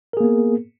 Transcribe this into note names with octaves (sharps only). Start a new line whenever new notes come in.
A#3 B3 G#4 A#4